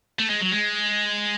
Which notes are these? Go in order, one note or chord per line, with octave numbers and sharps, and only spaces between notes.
A3
G#3
F#3
G#3